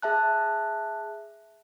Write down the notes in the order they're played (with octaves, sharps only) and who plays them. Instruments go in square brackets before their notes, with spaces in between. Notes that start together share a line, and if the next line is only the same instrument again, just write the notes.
[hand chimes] G#4 E5 A5 F#6